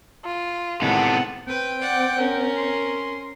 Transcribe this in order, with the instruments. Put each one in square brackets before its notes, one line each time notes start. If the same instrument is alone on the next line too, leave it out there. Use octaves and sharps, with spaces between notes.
[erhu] F4
[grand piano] A2 D#3 G#3 [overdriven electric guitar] C3 B3 [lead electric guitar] A4 [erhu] F#5
[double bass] C4 [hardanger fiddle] B4 [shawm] G5
[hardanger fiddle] D5 F#5
[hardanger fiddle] C#4 [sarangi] A#4
[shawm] C6